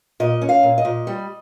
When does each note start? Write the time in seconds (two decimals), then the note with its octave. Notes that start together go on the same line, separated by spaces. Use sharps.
0.20 A#2 D#5
0.42 C#4
0.49 F5
0.63 A#2
0.78 D#5
0.85 A#2
1.07 G3